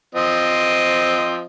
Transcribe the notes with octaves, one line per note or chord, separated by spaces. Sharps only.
F3 C4 D#5